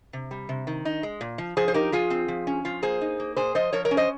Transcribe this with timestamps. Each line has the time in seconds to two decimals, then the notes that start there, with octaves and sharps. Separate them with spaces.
0.13 C3
0.31 G3
0.49 C3
0.67 D#3
0.85 D#4
1.03 G#3
1.21 A#2
1.38 F3
1.57 F3 G#4 C5
1.68 C5
1.74 D#4 G4 A#4
1.92 F3 F4 G#4
2.10 C4
2.28 F3
2.47 C#4
2.65 F3 F4
2.82 A#3 G#4 C5
3.01 D#4
3.20 A#3
3.37 A#2 G#4 C5
3.55 F3 C5 D#5
3.73 F3 A#4 C#5
3.85 A#4 C#5
3.91 C#4
3.97 C5 D#5